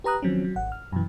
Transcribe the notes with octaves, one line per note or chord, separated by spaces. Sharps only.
G4 B4 A#5 D#6 F#6
D#3 F3 F#3 C4 C#4
F#3
G#1 F#5
F6
F#2 B2 E3